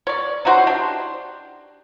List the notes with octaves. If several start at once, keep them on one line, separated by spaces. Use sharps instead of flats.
C#5 D5
D#4 E4 F#4 C5
D4 G4